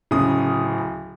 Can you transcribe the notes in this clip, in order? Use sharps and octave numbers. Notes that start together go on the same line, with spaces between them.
D1 C#3 D#6